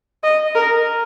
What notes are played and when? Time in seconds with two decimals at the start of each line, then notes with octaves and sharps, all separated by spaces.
0.23 D#5
0.55 A#4